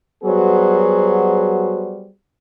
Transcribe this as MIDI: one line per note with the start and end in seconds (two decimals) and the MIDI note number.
0.24 2.08 54
0.24 2.08 55
0.24 2.08 59
0.24 2.08 66
0.24 2.08 68
0.24 2.08 72